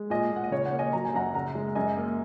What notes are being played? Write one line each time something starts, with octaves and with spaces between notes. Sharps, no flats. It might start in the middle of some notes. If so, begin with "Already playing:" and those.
Already playing: G#3
A#2 D#5 G#5
A#2 F#5
D#5
C#3 C#5
C#5 F#5
A#3
D#5 G#5
F#3 A#5
G#5
F#2 F#5 A#5
C#3 F#5 A#5
G#3
F#2 D#5 G#5
A#3